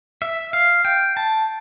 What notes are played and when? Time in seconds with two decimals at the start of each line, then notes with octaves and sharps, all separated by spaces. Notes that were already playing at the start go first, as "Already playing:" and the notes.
0.22 E5
0.53 F5
0.85 G5
1.17 A5